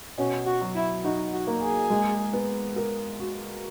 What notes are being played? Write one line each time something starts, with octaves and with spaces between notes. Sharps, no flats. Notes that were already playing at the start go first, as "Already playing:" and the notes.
B2 C#4
F#4
F#3
E4
D#4 F#4
F#4
A#3
G#4
G#3
B3
A#4
F#4